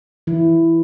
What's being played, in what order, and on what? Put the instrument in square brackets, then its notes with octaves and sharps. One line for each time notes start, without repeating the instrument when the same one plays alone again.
[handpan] E3 E4